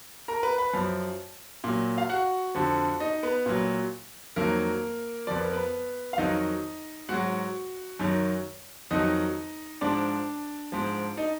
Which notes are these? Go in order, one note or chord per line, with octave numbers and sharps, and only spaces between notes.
A#4 A#5
B4 B5
B4 B5
F#2 F3
A#2 F#3
F5
F#4 F#5
F2 D3 F3
D#4 D#5
B3 B4
A#2 F#3
F2 D#3 F#3 A#3 A#4
F2 F3 D5
B4
A#4
B3 B4
F5
F2 D#3 F#3 D#4 D#5
G#2 F#3 F#4 F#5
F#2 D#3 F#3
F2 D#3 F#3 D#4 D#5
G#2 F3 D4 D5
G#2 F3
D#4 D#5